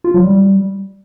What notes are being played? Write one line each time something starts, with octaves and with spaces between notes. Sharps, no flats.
F4
F#3
G3